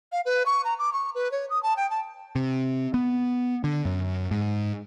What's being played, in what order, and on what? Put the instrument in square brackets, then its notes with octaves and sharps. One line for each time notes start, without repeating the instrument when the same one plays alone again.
[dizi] F5
B4
C#6
A#5
D6
C#6
B4
C#5
D#6
A5
G5
A5
[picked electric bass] C3
B3
D3
F#2
G#2